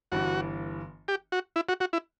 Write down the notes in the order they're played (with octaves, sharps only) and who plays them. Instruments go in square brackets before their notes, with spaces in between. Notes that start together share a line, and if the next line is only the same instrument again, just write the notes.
[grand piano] G1 G2 E3 [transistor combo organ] F#4
[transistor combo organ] G4
F#4
E4
F#4
F#4
E4